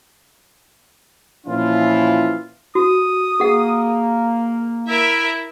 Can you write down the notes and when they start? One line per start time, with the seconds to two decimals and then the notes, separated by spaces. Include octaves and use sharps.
1.46 A#2 E3 F3 C#4 E4 F4
2.75 F#4 D#6
3.40 A#3 G#4 F#5
4.88 E4 A#4 E5